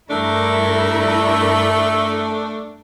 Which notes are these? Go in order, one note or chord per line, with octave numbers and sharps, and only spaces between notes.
G2 A3 D4 E4 A#4